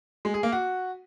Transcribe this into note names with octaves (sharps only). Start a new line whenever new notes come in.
G#3
G#4
A#3
F#4